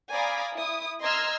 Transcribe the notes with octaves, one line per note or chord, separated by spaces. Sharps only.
D5 F5 G#5 A#5 B5 D#6
E4 D#6
D#5 A#5 C6 E6 F6 G#6